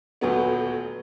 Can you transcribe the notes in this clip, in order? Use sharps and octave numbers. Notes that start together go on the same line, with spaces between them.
D#1 D2 F#3 B3